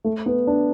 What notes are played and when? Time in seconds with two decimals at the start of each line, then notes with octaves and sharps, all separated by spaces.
0.04 A3
0.26 B3
0.47 D4